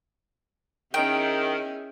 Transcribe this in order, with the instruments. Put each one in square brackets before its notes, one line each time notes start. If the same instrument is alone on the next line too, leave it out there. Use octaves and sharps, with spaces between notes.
[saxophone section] D#3 [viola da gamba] C#4 E4 G#4 [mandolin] G5